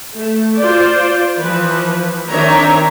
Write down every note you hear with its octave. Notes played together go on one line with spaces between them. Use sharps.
A3
F4 C5 D5
E3 F3 B4
D#3 C4 D4 C#5 E5 A#5